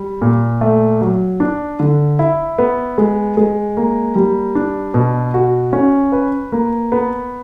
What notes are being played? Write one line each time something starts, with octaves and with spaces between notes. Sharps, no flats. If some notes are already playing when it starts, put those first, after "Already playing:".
Already playing: G3
A#2
A3
F#3
D4
D3
E4
B3
G#3
G#3
A#3
G3
D4
B2
F#4
C#4
B4
A#3
B3